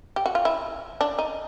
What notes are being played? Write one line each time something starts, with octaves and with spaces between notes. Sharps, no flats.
G4
F#4
F4
E4
D4
D#4